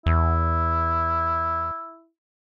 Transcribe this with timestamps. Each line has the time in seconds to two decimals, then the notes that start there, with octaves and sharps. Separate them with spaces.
0.06 E2 E4